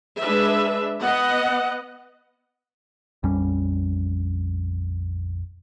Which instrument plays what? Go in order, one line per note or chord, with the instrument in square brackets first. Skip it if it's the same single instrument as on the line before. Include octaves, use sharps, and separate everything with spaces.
[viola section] G#3 D4 B4 E5
B3 D#5 F#5
[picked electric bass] A#1 F2 G3 C#4